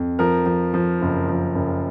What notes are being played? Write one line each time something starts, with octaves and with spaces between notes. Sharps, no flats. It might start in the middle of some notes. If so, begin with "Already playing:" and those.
Already playing: F2
F3 A#4
F3
F3
F#1
F3
F#1